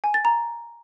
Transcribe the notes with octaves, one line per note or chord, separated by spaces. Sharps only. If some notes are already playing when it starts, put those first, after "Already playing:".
G#5
A6
A#5